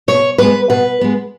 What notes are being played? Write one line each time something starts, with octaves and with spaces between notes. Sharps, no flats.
B2 C#5
G#3 B3 B4
B2 B4
G#3 B3